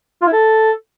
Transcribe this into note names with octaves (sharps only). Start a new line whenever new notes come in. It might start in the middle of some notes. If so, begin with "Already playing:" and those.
F4
E4
A4